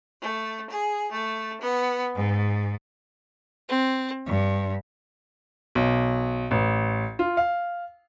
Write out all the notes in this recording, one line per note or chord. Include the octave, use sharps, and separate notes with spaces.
A3
G#4
A3
B3
G#2
C4
G2
B1
A1
F4
F5